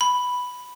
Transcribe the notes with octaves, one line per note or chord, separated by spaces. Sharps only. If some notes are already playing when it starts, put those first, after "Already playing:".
B5